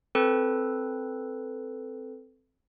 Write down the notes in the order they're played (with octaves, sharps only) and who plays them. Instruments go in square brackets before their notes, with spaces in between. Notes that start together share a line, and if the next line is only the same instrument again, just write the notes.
[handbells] C4 A4 B4